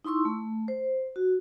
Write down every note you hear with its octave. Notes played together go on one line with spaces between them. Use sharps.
D#4 E4 C6 C#6 E6
A3
C5
F#4